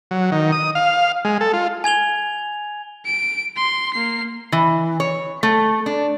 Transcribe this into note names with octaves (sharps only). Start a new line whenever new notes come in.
F#3
D#3
D#6
F5
G#3
A4
F4
G#5 G#6 F7 G7
D7
C6
A#3 C7
E3
C#5
A3
D4